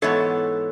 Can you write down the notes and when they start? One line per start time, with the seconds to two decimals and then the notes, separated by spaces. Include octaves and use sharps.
0.02 G#2 E3 B3 A4 C#5